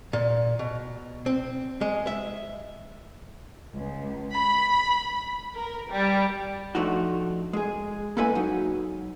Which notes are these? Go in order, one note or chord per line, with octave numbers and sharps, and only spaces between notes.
A#2
B2
C4
G#3
E5
C#2
B5
A#4
G3
F3 A3 D4 D#4 F#4
G#3 G#4
A#3 E4 A4 B4 D#5 G#5
F#3 D#4